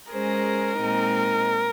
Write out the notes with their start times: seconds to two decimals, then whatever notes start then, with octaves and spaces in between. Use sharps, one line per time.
0.11 G#3 C#4 G#4 A#4 C5
0.78 A#2 G#3 C4 D#4